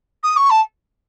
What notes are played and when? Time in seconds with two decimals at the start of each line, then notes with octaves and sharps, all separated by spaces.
0.23 D#6
0.37 C#6
0.50 A5